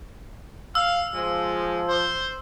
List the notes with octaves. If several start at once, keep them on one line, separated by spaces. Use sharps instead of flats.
F5 E6
F3 G#3
C5